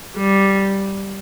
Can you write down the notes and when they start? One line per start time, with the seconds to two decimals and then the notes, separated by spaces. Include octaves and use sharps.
0.17 G3